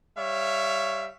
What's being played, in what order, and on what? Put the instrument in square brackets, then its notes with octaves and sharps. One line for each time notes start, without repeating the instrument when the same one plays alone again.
[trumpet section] G3 C#5 E5 F5